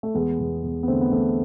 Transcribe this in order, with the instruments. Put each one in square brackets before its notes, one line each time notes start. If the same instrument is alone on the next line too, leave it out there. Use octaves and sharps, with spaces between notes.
[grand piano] A3
E2 G#3 B3
E2
E2
B3
D3 A3 C4
B3
E2 A3 C4